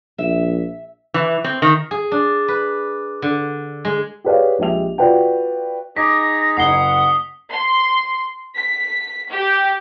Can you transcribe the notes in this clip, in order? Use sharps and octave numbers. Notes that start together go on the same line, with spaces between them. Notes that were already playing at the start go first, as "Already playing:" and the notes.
A#1 E5
E3
C4
D#3
G#4
D4
B4
D3
G#3
G4 G#4 B4 C#5 D5 F5
A#1 G#3 G4 E5 F7
F4 F#4 B4 D5 G5
D#4 G#4 D6 A#6 B6
F#1 F#5 D#6 C7 G7
C6
B6
G4